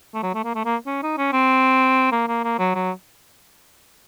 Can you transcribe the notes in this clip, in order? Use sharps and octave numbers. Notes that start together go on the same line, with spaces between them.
A3
F#3
A3
A#3
A3
A#3
C#4
D#4
C#4
C4
A#3
A#3
A#3
F#3
F#3